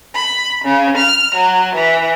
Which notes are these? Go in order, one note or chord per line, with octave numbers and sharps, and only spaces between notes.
B5
C#3
F6
F#3
E3